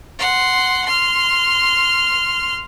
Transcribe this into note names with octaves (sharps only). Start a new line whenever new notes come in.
F#5 C6
C6 F6